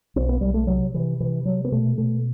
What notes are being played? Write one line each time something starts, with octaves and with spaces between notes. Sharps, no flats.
B1 C4
B3
B1 G3
A3
C3 F#3
C3 E3
C3 E3
C3 F#3
B3
B2 A3
B2 A3